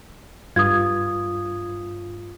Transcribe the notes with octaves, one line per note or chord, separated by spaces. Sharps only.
G2 F4 D#6 G#6